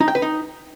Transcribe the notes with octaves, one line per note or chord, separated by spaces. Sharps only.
D#4
G5
B4
D#4